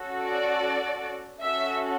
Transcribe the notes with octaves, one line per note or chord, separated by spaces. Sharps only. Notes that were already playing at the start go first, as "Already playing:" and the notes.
Already playing: C#4 F#4 A4
D5
C#4 F#4 A4 E5